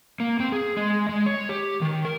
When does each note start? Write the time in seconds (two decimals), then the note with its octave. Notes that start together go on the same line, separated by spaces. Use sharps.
0.20 A#3
0.40 C4
0.52 G#4
0.77 G#3
1.09 G#3
1.26 C#5
1.49 G4
1.82 D#3
2.05 A#4